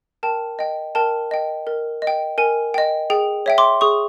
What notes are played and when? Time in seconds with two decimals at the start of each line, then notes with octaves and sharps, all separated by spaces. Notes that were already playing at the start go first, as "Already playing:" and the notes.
0.23 A#4 G5 A5
0.59 D#5 G5
0.95 A#4 G5 A5
1.31 D#5 G5
1.67 A#4
2.02 D#5
2.07 G5
2.38 A#4 G#5
2.74 D#5 G5
3.10 G#4 G5
3.46 C#5 E5 G5
3.58 C6 D6
3.81 G#4 C#6 D#6